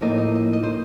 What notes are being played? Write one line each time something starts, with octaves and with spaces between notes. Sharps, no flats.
A2 F3 A#3 D#4 D#5
D#5
D#5
D#5
C5